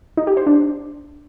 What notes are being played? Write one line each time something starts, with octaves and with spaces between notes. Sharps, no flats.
D#4
G4
C5
D4